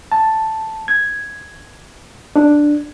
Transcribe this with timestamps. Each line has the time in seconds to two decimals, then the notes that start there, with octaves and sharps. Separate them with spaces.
0.12 A5
0.88 G#6
2.36 D4